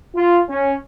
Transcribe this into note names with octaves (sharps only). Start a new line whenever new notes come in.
F4
C#4